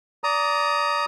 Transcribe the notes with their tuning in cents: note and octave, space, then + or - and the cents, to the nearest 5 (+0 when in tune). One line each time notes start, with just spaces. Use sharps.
D5 -20 A#5 +0 D#6 +10